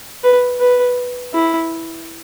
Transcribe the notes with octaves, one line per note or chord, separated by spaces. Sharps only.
B4
B4
E4